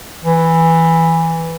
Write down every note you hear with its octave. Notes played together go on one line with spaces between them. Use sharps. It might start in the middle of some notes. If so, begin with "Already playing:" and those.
E3